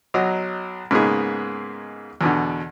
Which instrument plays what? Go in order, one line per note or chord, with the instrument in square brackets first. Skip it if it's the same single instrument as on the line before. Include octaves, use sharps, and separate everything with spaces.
[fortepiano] B1 F#3 D#5
G#2 C#3 A#3 B3 D#4 G#4
E2 B2 D3